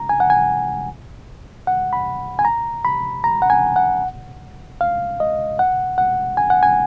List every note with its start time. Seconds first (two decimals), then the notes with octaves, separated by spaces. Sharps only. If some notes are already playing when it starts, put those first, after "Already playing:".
Already playing: A#5
0.09 G#5
0.20 F#5
0.30 G#5
1.67 F#5
1.93 B5
2.39 G#5
2.45 A#5
2.85 B5
3.24 A#5
3.42 F#5
3.50 G#5
3.76 F#5
4.81 F5
5.20 D#5
5.59 F#5
5.98 F#5
6.37 G#5
6.50 F#5
6.63 G#5